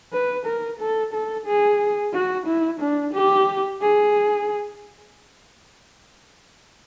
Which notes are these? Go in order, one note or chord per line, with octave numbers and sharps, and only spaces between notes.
B4
A#4
A4
A4
G#4
F#4
E4
D4
G4
G#4